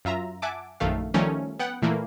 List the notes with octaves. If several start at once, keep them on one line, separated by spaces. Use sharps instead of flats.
F#2 F4 E5 A#5
E5 F#5 G#5 A5 D6 D7
A#1 F#2 D#3 A3 F5
D#3 F3 G3 A3 C#4 A#4
B3 F#5 G5
A#2 E3 A3 A#3 E4